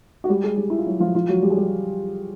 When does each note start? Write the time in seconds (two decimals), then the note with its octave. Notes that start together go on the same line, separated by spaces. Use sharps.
0.24 F#4
0.29 G3 G4
0.43 G#3 G#4
0.57 G3 G4
0.70 E4
0.78 F4
0.86 F#3 F#4
1.00 F3 F4
1.15 F3 F4
1.28 F#3 F#4
1.42 G3 G4
1.50 G#4
1.57 G3 G4